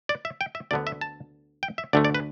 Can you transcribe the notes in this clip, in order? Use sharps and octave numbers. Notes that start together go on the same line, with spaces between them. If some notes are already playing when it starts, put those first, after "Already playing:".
D5
E5
G5
E5
D2 D3 B3 D5
E5
A5
G5
E5
D2 D3 A3 D5
D5
B4